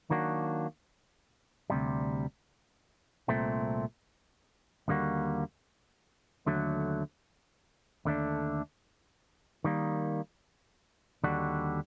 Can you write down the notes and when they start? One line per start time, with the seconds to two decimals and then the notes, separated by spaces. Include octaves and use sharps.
0.10 D#3 F#3 A#3 D4 F#4
1.70 D2 C3 G3
3.29 C2 A#2 A3 C4
4.88 D#2 D3 G3 A#3 F#4
6.46 D#2 D3 F#3 A3
8.05 D#2 D3 A3 D4
9.64 D#3 G3 A#3
11.24 D#2 D3 G3 D4 F#4